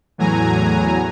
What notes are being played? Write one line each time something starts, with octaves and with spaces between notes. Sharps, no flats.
E2 A2 F#3 G#5 A#5